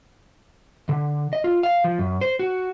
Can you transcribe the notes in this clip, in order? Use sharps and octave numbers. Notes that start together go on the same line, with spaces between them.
D3
D#5
F4
F5
F3
F#2
C5
F#4